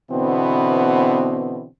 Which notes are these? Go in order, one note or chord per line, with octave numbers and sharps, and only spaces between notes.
B2 D3 E3 B3 C4